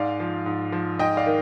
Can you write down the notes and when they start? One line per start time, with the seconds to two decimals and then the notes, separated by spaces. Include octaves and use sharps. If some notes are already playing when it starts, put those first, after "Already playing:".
Already playing: G#2 D5 F5
0.20 F3
0.46 G#2
0.72 F3
0.99 G#2 D#5 G5
1.17 D5 F5
1.26 D#3